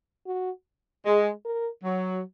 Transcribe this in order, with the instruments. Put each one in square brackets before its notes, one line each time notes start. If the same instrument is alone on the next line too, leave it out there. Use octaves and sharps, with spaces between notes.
[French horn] F#4
[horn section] G#3 [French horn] G#4
[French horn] A#4
[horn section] F#3